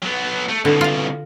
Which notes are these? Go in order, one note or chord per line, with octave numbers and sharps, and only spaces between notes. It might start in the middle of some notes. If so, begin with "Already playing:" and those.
F#3 B3
A3
C2 B2 D3
F4 F5